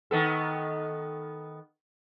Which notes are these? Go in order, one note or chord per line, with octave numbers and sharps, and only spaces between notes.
D#3 B3 A4